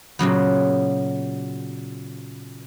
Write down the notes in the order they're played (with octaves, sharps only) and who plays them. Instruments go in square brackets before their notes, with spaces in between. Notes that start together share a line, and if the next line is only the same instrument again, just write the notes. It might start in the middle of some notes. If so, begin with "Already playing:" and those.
[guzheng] A#2 C#3 F#3 B3